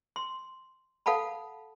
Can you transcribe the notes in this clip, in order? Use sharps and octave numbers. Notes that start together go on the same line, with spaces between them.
C6
A4 F5 F#5 A5 B5